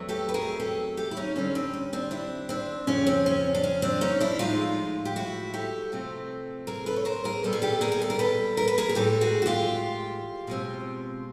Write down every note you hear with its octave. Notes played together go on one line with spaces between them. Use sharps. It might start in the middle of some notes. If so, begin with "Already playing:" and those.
Already playing: E2 F#3 A3 C4
G4 A4
B4
G#4 A#4
G4 A4
G4 A4
E4
C#4 D#4
F2 D3 G3 C4 C#4
C4
C#4
C4 D4
D4 E4
C4 D4
F2 C#3 F3 C#4
C4
C#4
D4
C#4
C4 D4
C#4 D#4
D4 E4
A2 F3 G#3 D#4 F4
G4
E4 F#4
G4 A4
C3 F3 A3 C4
G#4 A#4
A4 B4
C#5
A#4 C5
G#4 A#4
A#2 G3 B3 A4
G#4
G4 A4
G#4 A#4
G#4
A4
A#4
A4 B4
A#4
B4
G#4 A#4
G#4
A2 E3 G#3 G4 A4
F#4 G#4
F#4
F4 G4
B2 G#3 C4